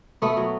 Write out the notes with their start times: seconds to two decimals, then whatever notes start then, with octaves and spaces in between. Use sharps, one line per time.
0.22 B2 A3 B3
0.37 F#3